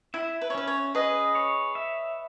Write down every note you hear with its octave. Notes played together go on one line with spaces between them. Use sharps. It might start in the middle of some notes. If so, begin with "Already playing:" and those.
E4 E5
B4
C#5
C#4 B4
C#5
G#4 B4 D#5
C#5
E5